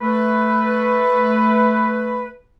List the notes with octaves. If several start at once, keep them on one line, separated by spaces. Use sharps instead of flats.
A3 B4